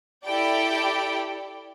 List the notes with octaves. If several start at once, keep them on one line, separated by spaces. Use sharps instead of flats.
E4 G4 A4 D5 G5